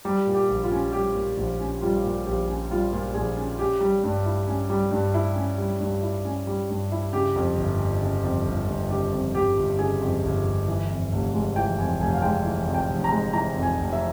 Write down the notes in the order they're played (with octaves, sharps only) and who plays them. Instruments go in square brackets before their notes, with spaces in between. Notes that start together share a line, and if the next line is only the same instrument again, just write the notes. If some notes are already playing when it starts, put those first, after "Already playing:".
[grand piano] G3 G4
A#2
G4
A#1
F4
C#4
G3 G4
A#2
A#1
C#4
G3 F4
A#2
A#1 G4
C#4
G3 F4
A#2
A#1 G#4
C#4
C#4 G4
G3
G2
E4
C#4
G3
G2
E4
C#4
G3
G2
E4
C#4
G3
G2
E4
C#3 G4
F2
G1
G1
C#3
F2
G1
G1
C#3 G4
F2
G1 G4
G1
C#3 G#4
F2
G1
G1
E3
F2
F1
G#3
E3 G5
F2 G#5
F1 G#5
F5
G#3 G5
E3
F2
G5
F1
A#5
G#3
E3 A#5
F2
G#5
F1
E5